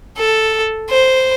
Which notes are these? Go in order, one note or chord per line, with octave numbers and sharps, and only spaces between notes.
A4
C5